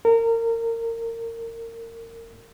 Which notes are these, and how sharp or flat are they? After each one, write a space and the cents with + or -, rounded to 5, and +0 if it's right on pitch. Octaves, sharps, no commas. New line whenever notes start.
A#4 -25